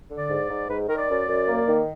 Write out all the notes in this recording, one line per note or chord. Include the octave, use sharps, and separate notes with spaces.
D3
D5
G#2
G#2
G#2 B4
D#3 A#4
D5
F#2
F#2
A#3
D#3